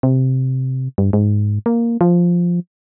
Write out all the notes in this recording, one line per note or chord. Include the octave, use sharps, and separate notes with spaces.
C3
G2
G#2
A#3
F3